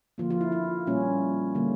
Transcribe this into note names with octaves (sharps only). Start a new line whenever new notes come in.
D3 F3 A#3 F4
F4
E4
E4
A#2 G3 A#3 C#4
D3 G3 A#3